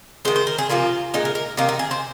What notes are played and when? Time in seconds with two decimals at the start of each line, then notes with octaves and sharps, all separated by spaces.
0.25 D#3 G#3 C5
0.36 C5
0.47 A#4
0.58 G#4
0.69 C3 F3 A#3 F4
1.14 A#2 G#3 D#4
1.25 A#4
1.35 A#4
1.57 C3 D#3 A#3 D#4
1.69 D#4
1.79 G#4
1.91 C5